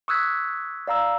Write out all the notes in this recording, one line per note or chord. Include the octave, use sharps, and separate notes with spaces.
C#6 D#6 E6 F#6 G#6 B6
D5 F5 A#5 E6